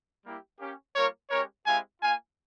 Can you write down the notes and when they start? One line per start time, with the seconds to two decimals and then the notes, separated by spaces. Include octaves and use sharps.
0.24 G3 A#3 E4 G4
0.60 A#3 C#4 G4
0.95 G3 A#3 F4 A#4 C#5
1.30 G#3 C#4 G4 A#4 C#5
1.66 G#3 C4 E4 G4 F5 G#5
2.01 A#3 F4 F5 G#5